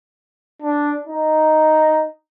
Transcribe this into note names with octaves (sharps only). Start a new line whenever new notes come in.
D4
D#4